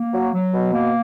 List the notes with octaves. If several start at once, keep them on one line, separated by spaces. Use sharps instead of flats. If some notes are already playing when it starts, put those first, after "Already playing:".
Already playing: A#3
F#3
F#3
B2
A#3